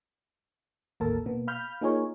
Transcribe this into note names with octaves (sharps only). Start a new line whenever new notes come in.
A1 D#2 A#3 A4 A#4 A5
B2 A#3 B3
F5 B5 F6 G6
A#3 D#4 F4 G#4 A#4 C#5